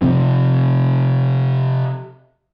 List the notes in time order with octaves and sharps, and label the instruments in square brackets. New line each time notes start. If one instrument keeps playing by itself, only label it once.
[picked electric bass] C3 F3 C4